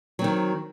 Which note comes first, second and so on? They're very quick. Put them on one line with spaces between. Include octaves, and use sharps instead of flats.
F#3 C4 D#3